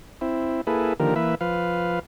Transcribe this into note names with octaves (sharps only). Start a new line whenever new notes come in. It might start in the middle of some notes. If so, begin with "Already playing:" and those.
C4 E4
A#3 E4 G#4 A4 B4
D3 D#3 F3 A#3 G4 A#4
E3 A#3 B4 E5
F3 B4 F5